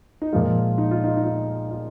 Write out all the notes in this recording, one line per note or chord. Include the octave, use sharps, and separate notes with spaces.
D#4
A#2 F3 G#3 F4
D#4
F4
D#4
D#4
F4
F4